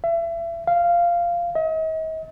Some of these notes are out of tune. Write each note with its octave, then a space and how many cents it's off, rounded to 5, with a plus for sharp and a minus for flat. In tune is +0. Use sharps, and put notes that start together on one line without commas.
E5 +35
F5 -10
D#5 +45